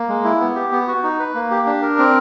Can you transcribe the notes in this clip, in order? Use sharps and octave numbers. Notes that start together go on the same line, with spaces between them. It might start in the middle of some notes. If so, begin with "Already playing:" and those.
Already playing: A#3
G#3
E4
B3
G4
B3
F#4
D#4
B4
A#3
G4
D4
A#4
C4